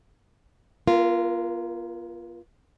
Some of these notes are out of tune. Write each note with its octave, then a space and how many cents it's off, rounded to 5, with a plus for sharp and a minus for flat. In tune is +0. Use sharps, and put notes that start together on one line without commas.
B3 -45 F4 -15 A#4 +0